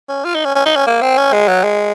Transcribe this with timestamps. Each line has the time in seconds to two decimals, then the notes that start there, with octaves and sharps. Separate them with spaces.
0.09 C#4
0.25 F4
0.35 D#4
0.45 C#4
0.55 C#4
0.65 D#4
0.76 C#4
0.87 A#3
1.02 C4
1.18 C#4
1.33 G#3
1.48 F#3
1.64 G#3